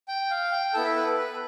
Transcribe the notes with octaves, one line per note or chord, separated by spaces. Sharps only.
G5
F5
G5
B3 E4 A4 A5
E5
B4
A4
B4